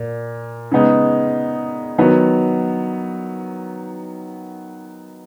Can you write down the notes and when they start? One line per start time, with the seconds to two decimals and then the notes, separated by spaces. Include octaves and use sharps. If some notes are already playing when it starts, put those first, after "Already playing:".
Already playing: A#2
0.72 C#3 G#3 B3 D#4
1.98 D#3 F#3 B3